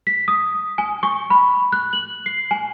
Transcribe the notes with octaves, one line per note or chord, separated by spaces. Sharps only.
B6
D#6
G#5
C#6
B5
F#6
F#7
C7
G#5